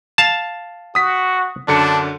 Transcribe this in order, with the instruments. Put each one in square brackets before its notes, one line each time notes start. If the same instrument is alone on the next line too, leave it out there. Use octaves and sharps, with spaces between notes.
[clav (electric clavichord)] F5 A5
[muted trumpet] F#4 [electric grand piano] D#6 B6
[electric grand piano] F#2 D3 C#7 [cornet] D4 [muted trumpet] A5